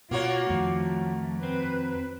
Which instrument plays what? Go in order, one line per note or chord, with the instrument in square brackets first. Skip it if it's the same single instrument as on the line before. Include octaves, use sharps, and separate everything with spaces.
[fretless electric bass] B2 [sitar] A#3 F#4 C#5 [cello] F4
[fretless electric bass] F2 D#3 [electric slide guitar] F3 [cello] A3
[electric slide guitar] C4 [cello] B4